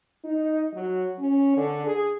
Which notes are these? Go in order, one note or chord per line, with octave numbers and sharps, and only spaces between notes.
D#4
F#3
C#4
D3
G#4